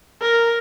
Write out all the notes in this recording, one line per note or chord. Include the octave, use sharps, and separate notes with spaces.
A#4